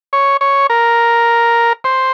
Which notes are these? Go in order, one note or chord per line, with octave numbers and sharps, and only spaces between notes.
C#5
C#5
A#4
C5